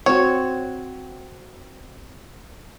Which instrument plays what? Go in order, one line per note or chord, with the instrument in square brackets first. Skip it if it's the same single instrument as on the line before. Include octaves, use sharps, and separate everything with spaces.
[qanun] C4 F#4 [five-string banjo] C#5